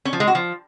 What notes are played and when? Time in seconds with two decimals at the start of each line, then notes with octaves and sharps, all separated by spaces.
0.05 C#4
0.13 F3
0.20 G#3
0.27 F#4
0.35 F3